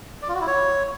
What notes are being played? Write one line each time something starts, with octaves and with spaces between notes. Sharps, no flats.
D5
F4
F#4
E4
C#5